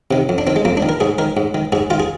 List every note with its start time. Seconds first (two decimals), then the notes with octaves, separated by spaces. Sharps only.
0.11 C3 D#3
0.29 F2
0.38 D4
0.47 D#3 C4
0.56 G#3
0.65 F2 A#3
0.77 D4
0.83 D#3
0.89 A#4
1.00 G#2 G#4
1.18 D#3 A#4
1.37 G#2
1.54 D#3
1.72 G#2 G#4
1.90 D#3 F4
2.00 G#4